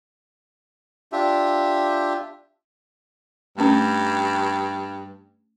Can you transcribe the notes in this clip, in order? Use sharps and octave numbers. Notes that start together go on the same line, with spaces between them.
D4 F4 G4 E5
G2 A3 C#4